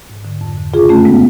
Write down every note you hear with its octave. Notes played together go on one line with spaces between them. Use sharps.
G#2
D3
F2
D3
C#3 F4 G#4
F#2 A3 C#4
C#3 G#3 B3